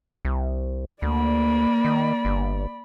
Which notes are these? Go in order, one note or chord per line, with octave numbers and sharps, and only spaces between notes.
C2
D2 A#3 D5 B5
D#3
G1